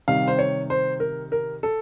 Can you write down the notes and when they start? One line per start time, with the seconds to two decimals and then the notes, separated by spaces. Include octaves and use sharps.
0.08 C3 D#3 G3 F5
0.28 C5
0.39 C#5
0.70 C5
1.00 A#4
1.32 A#4
1.63 A4